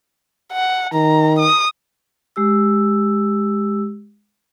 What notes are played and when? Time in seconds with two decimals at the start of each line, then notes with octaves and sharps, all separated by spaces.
0.53 F#5
0.94 D#3 A#5
1.39 D#6
2.36 G#3 G4 E6